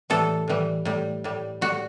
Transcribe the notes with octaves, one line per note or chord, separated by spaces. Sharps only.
A2 E3 G3 A4
A2 E3 G3
A2 G3
A2 G3
A2 G3 F#4